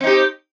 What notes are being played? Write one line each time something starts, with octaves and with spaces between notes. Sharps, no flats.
C4 D#4 G4